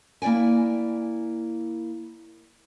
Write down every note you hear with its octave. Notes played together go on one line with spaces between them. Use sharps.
A#3 E4 D5 G5 G#5